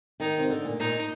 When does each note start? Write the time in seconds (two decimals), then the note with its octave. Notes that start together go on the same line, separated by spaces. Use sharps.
0.20 D#3 D#4
0.38 C3
0.49 D3
0.65 A#2
0.80 A#2 D#4